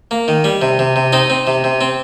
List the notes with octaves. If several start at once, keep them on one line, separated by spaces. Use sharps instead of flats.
A#3
D#3
G3
C3
C3
C3
C4 D#4 D#5
C4
C3
C3
C4